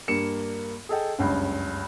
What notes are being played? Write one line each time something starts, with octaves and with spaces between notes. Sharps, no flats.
G2 A#3 C#7 E7
G#4 A4 D#5 G5
F#1 C#2 G2